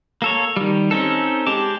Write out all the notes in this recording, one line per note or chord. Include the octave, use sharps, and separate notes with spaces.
A#3 A4 C#5
D#3 G3
C4 C#4 D#4 A4
G#3 G4 A5 D6